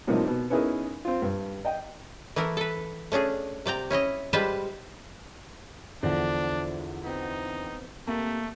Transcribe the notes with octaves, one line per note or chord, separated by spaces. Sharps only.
A2 C3 F3 G3 A#3 D#4
B2
B3 C#4 D#4 E4 G#4 A#4
C4 F4
G2
D#5 G5
E3 A3 E4 A#4
A4 B4
A3 C#4 D4 G#4
C3 D5 G5 A#5
C#4 E4 C#5 D#5
G3 G#3 F4 B4 C5 A5
E2 D3 F3 D4 C5 D5 F#5
B3 C4 D#4
C3 A3 A#3